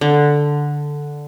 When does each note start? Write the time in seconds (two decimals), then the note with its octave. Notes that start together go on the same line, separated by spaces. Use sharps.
0.01 D3